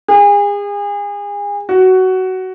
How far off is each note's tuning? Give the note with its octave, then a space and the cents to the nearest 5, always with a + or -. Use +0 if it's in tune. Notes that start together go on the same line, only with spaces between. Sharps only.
G#4 -35
F#4 +15